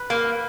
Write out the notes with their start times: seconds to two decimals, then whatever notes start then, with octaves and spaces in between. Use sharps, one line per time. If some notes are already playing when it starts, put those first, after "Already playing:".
Already playing: B4
0.10 A#3